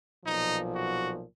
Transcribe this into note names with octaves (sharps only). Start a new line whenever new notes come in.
B1 A#2 F3 D#4
F#4